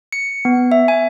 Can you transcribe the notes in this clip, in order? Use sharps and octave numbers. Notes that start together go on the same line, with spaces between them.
C#7
B3
E5
G#5